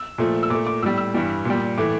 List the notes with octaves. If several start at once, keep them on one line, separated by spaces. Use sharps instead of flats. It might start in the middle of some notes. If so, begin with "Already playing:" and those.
Already playing: E6
A#2 F3 A3
E6
A#2 A3 D6
D6
A2 G3 E6
E6
G2 E3 G3
A#2 G3
A2 E3 A3 D6